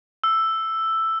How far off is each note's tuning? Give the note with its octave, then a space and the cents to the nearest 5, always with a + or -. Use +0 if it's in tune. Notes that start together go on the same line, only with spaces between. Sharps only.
E6 +5